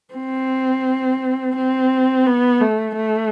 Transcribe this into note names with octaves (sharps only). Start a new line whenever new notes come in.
C4
C4
B3
A3
A3